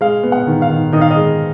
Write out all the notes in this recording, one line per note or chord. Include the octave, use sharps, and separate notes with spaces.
G#3 F5
B3
F#5
D#3
F5
D#3
D#3 D#5
F5
D#5
G#3